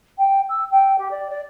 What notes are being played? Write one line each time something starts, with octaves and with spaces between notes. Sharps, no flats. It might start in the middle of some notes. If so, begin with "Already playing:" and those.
G5
E6
G5
G4
D5
D5